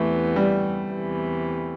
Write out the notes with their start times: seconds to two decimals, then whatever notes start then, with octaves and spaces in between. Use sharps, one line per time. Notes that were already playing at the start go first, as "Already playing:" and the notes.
Already playing: E2 C3 E3 A3 B3
0.36 G3
0.94 E2 C3 E3